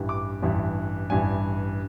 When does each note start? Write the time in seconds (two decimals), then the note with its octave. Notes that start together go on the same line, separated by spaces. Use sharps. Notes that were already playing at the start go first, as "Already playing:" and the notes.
Already playing: A1 G2 E3 G3
0.09 D6
0.42 A1 G2 E3 G3
1.10 A1 G2 E3 G3 G#5